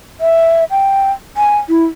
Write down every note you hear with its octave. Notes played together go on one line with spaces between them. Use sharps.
E5
G5
G#5
E4